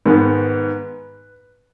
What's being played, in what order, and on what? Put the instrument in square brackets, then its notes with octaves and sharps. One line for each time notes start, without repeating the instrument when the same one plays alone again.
[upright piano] G#2 D#3 G#3 B3 B4